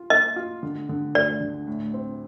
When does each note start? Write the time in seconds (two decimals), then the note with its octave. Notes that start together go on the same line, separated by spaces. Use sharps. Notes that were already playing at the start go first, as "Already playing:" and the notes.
Already playing: F4
0.10 A#3 D#5
0.36 F4
0.63 D3
0.89 D3
1.15 D2 D5
1.41 D3
1.67 A2
1.94 C4